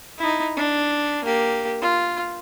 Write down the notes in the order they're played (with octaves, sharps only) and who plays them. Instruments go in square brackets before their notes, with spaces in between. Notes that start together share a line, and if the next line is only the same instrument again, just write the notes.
[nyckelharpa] D#4 E4
D4
A#3 G4
F4